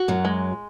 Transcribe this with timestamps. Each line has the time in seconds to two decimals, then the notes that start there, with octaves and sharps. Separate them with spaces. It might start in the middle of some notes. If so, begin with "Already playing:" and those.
Already playing: F#4
0.08 F#2 F#3
0.25 G#3